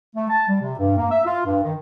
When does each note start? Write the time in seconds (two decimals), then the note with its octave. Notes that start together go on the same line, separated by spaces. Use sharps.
0.16 A3
0.29 A5
0.48 G3
0.61 C3
0.78 G2
0.97 A#3
1.10 E5
1.26 F4
1.45 G2
1.63 D#3